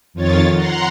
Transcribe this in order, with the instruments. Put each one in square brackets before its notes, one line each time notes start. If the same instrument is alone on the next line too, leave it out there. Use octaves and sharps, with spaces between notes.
[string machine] F2 D#3 F4 C#5 A6
F#5 A#5 C6